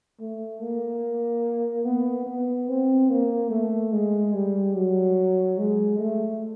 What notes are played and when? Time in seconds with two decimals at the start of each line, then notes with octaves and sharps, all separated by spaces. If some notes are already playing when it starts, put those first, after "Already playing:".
0.20 A3
0.61 A#3
1.85 B3
2.27 B3
2.68 C4
3.10 A#3
3.50 A3
3.92 G#3
4.34 G3
4.75 F#3
5.58 G#3
5.99 A3